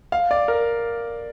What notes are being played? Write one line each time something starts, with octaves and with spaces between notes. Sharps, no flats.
F5
D5
A#4